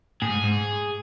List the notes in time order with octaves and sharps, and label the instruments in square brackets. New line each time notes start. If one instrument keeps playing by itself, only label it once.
[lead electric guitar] A2 [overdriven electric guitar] G#4
[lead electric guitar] G#2
G#2